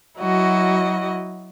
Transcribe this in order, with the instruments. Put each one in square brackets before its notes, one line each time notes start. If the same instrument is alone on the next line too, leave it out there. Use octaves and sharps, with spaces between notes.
[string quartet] F#3 E4 F#4 D#5